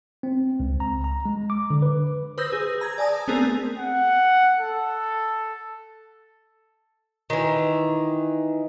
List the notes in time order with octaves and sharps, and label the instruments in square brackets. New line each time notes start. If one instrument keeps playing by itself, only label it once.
[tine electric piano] C4
C#2
A#5
A#5
G#3
D6
D3
B4
[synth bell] B4 C5 D#6 E6 G6 A#6
G#4
A#5 G#6 A#6
D5 G#5 A5 D#6
A3 B3 C4 G#4 A#4
[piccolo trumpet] F#5
A4
[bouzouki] D#3 E3